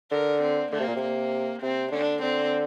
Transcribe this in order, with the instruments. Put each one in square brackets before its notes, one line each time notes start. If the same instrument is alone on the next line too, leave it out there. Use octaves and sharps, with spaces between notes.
[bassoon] D3 [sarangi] A#4
[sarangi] C4
[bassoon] D3 [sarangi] A#3
[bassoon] C3
A#2
C3
[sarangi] A#3
[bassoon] C3 [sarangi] C4
[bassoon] D3 [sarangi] D4
[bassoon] D3 [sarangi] C4